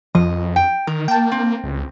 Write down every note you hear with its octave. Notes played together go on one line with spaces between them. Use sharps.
F2 F3 D#5
G5
D#3 A#4
A#3 G5 A5
C4
C#2